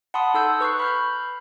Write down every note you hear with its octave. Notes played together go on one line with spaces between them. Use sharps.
F#5 A5 B5 C6 D#6
D#4 A4 E6 G6
B4 C#6 F#6 C7
B5 F6 G6